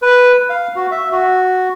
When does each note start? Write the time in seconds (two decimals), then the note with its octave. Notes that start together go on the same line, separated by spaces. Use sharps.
0.02 B4
0.50 F5
0.76 F#4
0.91 E5
1.12 F#4